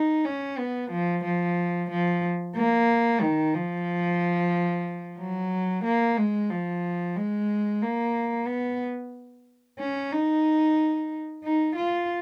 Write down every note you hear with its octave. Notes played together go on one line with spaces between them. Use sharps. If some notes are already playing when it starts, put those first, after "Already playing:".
Already playing: D#4
C#4
B3
F3
F3
F3
A#3
D#3
F3
F#3
A#3
G#3
F3
G#3
A#3
B3
C#4
D#4
D#4
F4